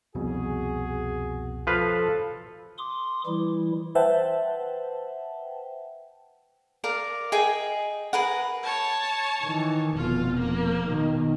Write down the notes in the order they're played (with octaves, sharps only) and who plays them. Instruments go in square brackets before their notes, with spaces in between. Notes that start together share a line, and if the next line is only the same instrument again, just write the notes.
[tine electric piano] C2 F2 B2 [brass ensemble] F#4 G#4
[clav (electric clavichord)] F3 B4 F5 [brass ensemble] A4
[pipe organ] C6 D6 D#6
E3 G3 E4
[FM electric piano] B4 C5 E5 F#5 G5 A5
[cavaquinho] A#4 D5 F5
G#4 D#5 G5 G#5
G#4 A#4 B4 F#5
[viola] C#5 A5
[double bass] D#3 E3
[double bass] F1 B2 [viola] F4
[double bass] F2 [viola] A#3
[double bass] B2 D#3